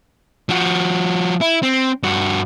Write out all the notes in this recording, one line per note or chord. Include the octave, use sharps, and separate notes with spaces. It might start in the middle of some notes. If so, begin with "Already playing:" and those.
F3 F#4
E4
C4
G2 F#4